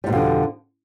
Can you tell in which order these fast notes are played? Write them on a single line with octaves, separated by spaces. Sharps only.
G3 G#2 B2 F2 D3